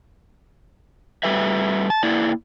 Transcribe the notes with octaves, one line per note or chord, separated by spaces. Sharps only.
G3 A3 B4 E5
A5
A#3 E4 D5